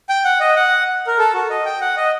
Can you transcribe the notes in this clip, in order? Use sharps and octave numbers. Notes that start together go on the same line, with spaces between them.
G5
F#5
D#5
F#5
A#4
A4
F#4
D#5
G5
F#5
D#5